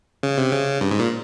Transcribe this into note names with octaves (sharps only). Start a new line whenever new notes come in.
C#3
C3
C#3
G2
G#2
A#2